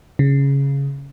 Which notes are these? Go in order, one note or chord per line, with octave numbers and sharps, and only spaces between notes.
C#3